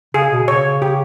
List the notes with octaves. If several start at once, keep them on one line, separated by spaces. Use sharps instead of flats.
C#3 G#4
B2
C#3 C#5
C#3
G4